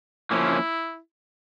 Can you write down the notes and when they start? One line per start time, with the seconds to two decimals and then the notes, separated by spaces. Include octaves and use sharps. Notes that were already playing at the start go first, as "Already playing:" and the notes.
0.31 F3 A#3 C#4 E4